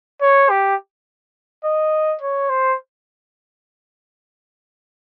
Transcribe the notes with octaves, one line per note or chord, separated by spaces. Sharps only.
C#5
G4
D#5
C#5
C5